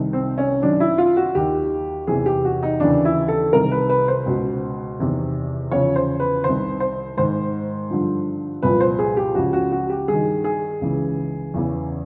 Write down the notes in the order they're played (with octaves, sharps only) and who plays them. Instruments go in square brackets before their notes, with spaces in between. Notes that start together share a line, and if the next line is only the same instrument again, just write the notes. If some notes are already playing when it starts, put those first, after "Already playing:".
Already playing: [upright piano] C2 C3 D#3
C4
C#4
F#2 D#3 D4
E4
F4
F#4
D#2 D#3 G4
E2 C3 E3 G#4
G4
F#4
D#4
D#2 C#3 E3 D4
E4
A4
C2 C3 D#3 A#4
B4
B4
C5
C#2 B2
E2 C3 D#3
E2 C#3 F3 C#5
C5
B4
C2 C3 D#3 C5
C5
G#2 D#3 C5
G2 D3 F3
C2 A#2 F3 B4
C5
G#4
G4
C#2 C#3 F3 F#4
F#4
F#4
G4
G2 D#3 G#4
G#4
C#2 C#3 E3
E2 C#3 E3